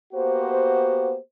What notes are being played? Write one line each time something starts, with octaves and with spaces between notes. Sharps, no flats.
A#3 B3 F#4 G4 C5